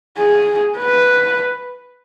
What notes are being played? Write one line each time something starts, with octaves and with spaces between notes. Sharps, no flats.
G#4
B4